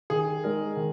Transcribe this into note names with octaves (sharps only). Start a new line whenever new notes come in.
D#3 G#4
G#3 D#4 A#4
D#3